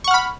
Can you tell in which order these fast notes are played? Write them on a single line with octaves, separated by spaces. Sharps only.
C#6 F#5 F6 B5